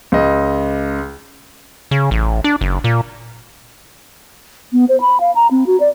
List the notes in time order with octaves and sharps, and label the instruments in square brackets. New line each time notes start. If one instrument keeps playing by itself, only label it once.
[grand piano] C#2 D#5
[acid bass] C#3
A1
D4
F#1
A#2
[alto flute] B3
C5
B5
F5
A#5
C4
F#4
D5